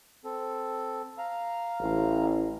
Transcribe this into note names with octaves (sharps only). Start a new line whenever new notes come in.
C4 A4
F5 A#5
A1